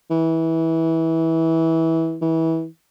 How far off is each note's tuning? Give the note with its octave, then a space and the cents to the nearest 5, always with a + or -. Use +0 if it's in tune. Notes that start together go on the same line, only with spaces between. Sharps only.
E3 -20
E3 -25